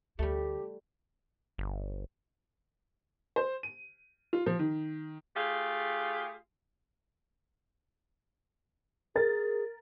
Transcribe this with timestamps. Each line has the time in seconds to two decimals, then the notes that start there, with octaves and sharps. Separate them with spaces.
0.19 D2 G3 A3 G4
1.58 G1
3.36 C5
3.63 D#7
4.33 F4
4.46 F3
4.59 D#3
5.36 A3 F4 G4 G#4
9.16 G#4 A#4 A6